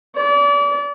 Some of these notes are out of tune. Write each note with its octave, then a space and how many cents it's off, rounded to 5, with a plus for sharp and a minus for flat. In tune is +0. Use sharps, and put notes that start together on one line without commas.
D5 -35